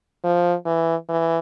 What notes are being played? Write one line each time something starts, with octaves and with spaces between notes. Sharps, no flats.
F3
E3
E3